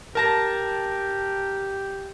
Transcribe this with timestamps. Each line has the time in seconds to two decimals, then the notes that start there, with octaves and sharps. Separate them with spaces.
0.15 G4 A#4 A5 A#6